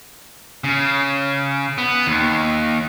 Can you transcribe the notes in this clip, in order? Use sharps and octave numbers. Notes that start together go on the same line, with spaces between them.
C#3
B3
D#2